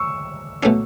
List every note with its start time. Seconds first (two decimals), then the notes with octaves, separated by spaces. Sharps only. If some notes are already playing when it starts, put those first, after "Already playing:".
Already playing: C#6 E6
0.63 B2 A3 C#4 E4